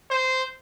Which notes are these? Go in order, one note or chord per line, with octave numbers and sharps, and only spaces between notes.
C5